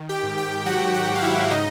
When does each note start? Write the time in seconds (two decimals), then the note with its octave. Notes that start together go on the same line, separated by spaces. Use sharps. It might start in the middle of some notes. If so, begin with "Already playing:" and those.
Already playing: D#3
0.09 G4 G5
0.23 G#2
0.38 G4 G5
0.66 F#3 F#4 F#5
0.94 F#4 F#5
1.09 G#2
1.15 F5
1.22 E4 E5
1.51 C#3 D#4 D#5